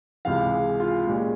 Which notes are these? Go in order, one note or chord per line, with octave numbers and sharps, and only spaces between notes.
C#2 C3 E3 F5
G#4
F4
A#2 G#3 C#4 G4